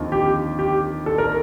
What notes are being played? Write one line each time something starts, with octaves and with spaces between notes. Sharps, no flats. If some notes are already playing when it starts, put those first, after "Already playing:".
Already playing: D#2 D3 F3 C4 D#4
G4
G4
A4
A#4